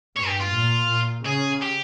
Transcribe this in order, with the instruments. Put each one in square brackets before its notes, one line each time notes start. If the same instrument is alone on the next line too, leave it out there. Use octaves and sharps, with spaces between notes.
[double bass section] G2 [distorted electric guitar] C#5
[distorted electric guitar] G4
F4
[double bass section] A#2
A#2
[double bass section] C#3 [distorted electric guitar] G#4
[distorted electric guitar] G4